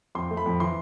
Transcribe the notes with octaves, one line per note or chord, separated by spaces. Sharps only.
F2 C6
A3
B5
F2
E3 C6